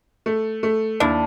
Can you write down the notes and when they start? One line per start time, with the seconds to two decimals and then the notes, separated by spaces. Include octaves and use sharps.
0.26 A3
0.63 A3
1.00 D#2 D4 E4